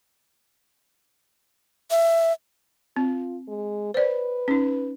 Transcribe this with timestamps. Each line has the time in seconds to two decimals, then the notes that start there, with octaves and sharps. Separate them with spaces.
1.91 E5
2.96 C4 F4
3.48 G#3
3.94 B4 C5 D5
4.48 C#4 D#4